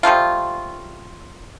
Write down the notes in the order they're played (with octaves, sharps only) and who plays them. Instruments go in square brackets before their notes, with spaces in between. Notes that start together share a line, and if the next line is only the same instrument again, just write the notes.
[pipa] F3 G3 A3 F4